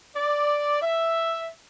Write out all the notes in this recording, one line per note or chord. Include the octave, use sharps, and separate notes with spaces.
D5
E5